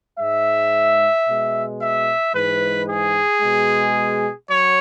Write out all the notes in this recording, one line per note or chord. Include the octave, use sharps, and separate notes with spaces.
G#2 G#3 E5
B2 G#3
E5
G#2 E3 G#3 B4
G#4
B2 G#3
F#3 C#5